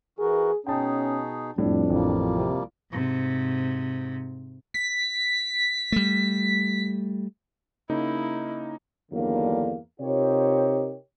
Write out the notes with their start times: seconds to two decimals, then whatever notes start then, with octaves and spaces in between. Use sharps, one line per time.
0.19 E3 F#4 G#4 A#4
0.66 B2 C#4 D#4 G#4 G5 A5
1.58 F2 A2 G3 D4
1.90 A1 F3 G3 A#3
2.35 C3
2.92 G#2 C3
4.74 B6
5.92 G3 A3
7.90 C#3 A#3 D#4 E4
9.12 E2 G2 D3 D#3 F#3 A#3
10.01 C3 D#4 F4 G4 A#4 C#5